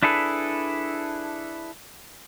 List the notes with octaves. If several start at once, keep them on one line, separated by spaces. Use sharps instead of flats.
D4 E4 G#4 A4 B4